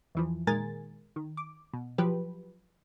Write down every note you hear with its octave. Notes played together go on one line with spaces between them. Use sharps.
E2 E3 F3
A#2 D#3 G#3 A#4 G#5 A6
D#3
D6
B2
F3 F#3 G4 B4